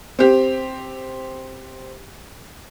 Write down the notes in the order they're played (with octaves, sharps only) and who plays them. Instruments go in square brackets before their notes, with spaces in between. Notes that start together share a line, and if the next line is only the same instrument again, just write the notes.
[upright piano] C4 G4